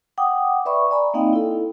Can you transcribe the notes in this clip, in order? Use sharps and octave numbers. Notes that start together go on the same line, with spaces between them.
F#5 G5 D6 D#6
B4 D5 E5 B5 C#6
D5 G#5 A#5 B5
A#3 C4 D#4 D#5 F5 G5
E4 A4